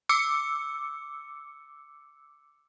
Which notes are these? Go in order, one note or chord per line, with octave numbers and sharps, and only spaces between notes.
D6 E6 C#7